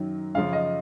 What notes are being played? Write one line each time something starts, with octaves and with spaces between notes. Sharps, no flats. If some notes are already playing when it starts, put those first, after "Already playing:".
Already playing: F#2 D#3 F#3
F#2 C#3 F3 F5
D#5